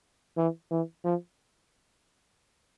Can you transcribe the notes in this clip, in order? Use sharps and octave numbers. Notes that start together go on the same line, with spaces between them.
E3
E3
F3